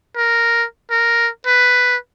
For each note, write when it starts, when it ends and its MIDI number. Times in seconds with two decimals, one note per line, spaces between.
0.17 0.65 70
0.91 1.29 70
1.47 1.96 71